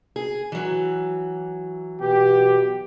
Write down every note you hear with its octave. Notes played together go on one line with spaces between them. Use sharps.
G#4
E3 F#3
B2 B3 G4